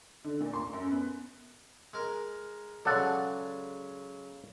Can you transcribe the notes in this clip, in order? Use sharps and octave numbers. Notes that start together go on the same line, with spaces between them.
D3
A#2
C6
F#2
B3
G#3 A#4
C#3 F#3 G#3 A4 D5 F#5